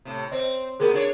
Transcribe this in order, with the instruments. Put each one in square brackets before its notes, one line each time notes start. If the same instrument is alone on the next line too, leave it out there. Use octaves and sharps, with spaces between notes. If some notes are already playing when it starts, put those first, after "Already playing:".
[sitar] A2 C3
[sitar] C4 [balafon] C5 D#5
[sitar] A#3 B3 G4 [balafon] G#4 A#4
[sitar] D4 F4 C#5